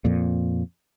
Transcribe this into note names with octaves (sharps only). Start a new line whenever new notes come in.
F2 A#2